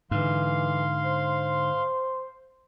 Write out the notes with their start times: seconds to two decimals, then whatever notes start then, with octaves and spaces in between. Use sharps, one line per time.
0.11 G#2 D3 E3 F5 C6
1.05 C5